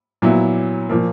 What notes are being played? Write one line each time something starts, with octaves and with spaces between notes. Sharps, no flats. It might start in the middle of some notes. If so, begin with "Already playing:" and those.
A#2 F#3 B3 E4
A#2 F3 A#3